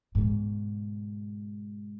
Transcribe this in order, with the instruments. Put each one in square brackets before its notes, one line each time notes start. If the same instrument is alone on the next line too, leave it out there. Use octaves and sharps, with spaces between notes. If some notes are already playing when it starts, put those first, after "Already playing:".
[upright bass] G#2 B2